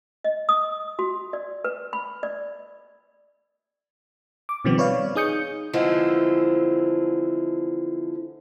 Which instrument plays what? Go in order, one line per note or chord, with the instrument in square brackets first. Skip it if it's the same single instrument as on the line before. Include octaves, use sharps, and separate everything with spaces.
[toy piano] D#5
D#6
F#4
D5
B4
B5
D5
[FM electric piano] D6
B2 D#3 F3 G3 B3 C4
B4 C#5 D5 F5
D#4 G#4 D#6 G6 C#7
[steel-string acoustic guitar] D3 E3 F3 G#3 A3 C4